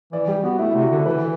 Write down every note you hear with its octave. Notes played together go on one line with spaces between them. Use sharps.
E3 D5
G3 G4
B3 F#4
A3 E4
C3 E4
F#4
D3 A4
E3 B4